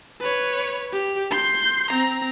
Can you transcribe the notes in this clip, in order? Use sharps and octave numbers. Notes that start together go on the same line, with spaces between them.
B4 C#5
G4
C6 G6
C4 A#5